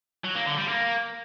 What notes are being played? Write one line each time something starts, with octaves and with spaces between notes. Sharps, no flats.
F#3
A#3
D3
G3
A#3